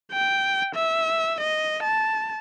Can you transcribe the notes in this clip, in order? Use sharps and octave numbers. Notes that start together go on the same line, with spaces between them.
G5
E5
D#5
A5